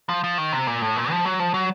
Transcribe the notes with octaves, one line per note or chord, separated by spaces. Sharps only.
F3
F3
D#3
C3
A#2
A2
A#2
F3
F#3
F3
F#3